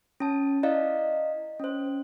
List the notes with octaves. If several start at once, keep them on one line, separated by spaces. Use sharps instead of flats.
C#4 A5
E4 D5 D#5 F5
C#4 C5